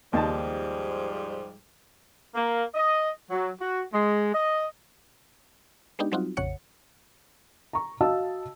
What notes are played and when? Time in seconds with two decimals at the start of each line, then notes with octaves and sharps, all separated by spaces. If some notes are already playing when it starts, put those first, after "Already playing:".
0.13 D#2 G#2 F3 G3 D#4 A5
2.34 A#3
2.74 D#5
3.30 F#3
3.60 F#4
3.92 G#3
4.33 D#5
5.99 G#3 B3 D4 D#4 G4
6.12 F#3 G3 C4 D#4 F4 F#4
6.37 A#1 F2 C#3 C#5 F#5 C#7
7.73 A#5 C#6
8.01 F#4 D#5 F5 A5 E6